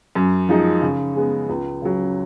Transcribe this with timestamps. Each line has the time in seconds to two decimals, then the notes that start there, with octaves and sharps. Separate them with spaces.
0.15 F#2
0.49 F3 G#3 D#4
0.82 C#3
1.16 G#3 B3
1.49 C#2
1.82 C#3 F#3